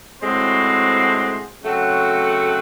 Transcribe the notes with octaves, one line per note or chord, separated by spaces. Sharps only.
A2 G#3 C4 F#4 C5
C#3 F#3 A3 C4 F#4